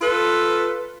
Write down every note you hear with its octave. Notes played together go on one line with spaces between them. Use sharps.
F4 A4 B4